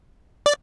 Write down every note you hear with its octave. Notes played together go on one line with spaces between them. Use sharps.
D5